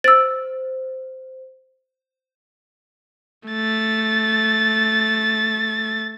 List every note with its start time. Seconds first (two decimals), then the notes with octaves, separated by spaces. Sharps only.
0.04 C5 E6 A6
3.48 A3 A6